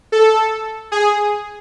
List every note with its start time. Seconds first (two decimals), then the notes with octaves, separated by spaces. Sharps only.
0.12 A4
0.92 G#4